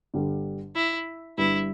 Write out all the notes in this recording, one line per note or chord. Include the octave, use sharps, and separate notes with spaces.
G1 G2 D3 G3
E4
G1 G2 G3 D4 E4 B4